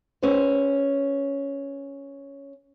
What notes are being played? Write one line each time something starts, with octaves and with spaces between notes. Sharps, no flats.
C#4 G#4 B4 C5